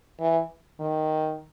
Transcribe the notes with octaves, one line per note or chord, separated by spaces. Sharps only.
E3
D#3